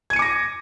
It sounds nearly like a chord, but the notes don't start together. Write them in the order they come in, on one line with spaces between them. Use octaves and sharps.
G#6 D#7 C#7 D6 A#6